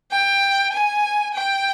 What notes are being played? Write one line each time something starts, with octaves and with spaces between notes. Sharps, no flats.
G5
G#5
G5